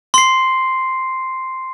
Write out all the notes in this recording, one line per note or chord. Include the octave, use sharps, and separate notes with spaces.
C6 C7